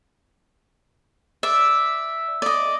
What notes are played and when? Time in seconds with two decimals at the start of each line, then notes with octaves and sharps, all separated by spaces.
1.43 D5 E5
2.42 D5 D#5